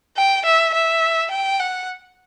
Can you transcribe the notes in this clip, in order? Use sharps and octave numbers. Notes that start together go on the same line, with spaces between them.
G5
E5
E5
G5
F#5